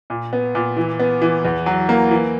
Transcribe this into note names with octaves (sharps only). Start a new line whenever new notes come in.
A#2
B3
A#2
E3
B3
E3
E2
F#3
A#3
E3